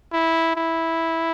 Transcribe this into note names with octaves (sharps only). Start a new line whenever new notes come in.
E4
E4